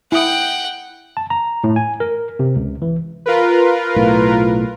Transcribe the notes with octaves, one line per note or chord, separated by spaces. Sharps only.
E4 F#5 G5 D#6
A5
A#5
A2
G#5
A#4
C3
C#2
E3
F4 A#4 B4
B1 A2